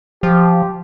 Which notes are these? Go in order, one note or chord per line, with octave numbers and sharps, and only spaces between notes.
F3 G4